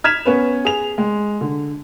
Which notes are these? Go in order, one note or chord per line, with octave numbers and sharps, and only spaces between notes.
F6 G#6 B6 E7 F7
B3 C#4 B4
G#4 F7
G#3
D3